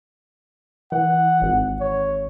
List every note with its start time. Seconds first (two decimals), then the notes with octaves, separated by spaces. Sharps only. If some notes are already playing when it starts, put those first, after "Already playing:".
0.92 E3 F#5
1.42 G#1
1.81 C#5